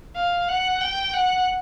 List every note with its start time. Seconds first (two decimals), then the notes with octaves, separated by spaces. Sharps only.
0.16 F5
0.48 F#5
0.81 G5
1.13 F#5